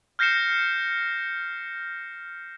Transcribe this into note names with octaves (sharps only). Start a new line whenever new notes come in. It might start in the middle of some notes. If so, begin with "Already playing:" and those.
F6 G6 A#6 C7 C#7 E7